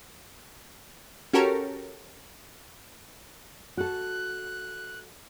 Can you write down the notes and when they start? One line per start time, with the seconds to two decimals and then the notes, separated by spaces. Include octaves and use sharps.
1.33 C#4 F#4 G4 A4 A#4 C#5
3.77 F#4 A4 F#6